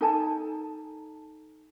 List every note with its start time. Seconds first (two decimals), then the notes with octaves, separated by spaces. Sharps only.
0.01 D#4 A4 G#5 A5